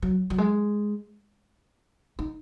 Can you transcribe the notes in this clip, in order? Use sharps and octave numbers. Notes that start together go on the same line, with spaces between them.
F#3
F#3
G#3
D#4